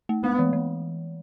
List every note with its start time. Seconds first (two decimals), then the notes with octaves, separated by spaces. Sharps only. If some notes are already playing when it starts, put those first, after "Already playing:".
0.09 A3
0.23 G#3 B3
0.39 E3
0.53 E3